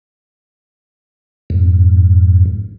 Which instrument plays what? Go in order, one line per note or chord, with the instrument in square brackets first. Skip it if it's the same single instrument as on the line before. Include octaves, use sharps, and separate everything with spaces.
[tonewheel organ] F2 G#2